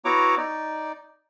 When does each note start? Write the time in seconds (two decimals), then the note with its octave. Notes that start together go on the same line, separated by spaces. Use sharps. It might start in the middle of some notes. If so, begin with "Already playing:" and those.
0.05 B3 E4 F#4 C#5 A#5 D6
0.38 D#4 D5